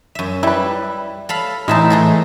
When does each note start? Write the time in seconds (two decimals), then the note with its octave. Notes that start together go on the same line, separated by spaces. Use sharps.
0.15 F#2 E5
0.43 G3 E4 B4
1.29 A4 F5 B5
1.68 A2 E3 G#3 C4 D#4 E5 A5
1.90 E3 G#4 A4